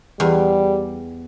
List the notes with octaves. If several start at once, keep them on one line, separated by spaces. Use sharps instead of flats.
E2 G3